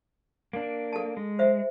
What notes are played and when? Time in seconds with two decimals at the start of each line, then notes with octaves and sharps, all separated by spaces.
0.53 A#3 D4
0.93 A4 A5
1.17 G#3
1.39 C5 E5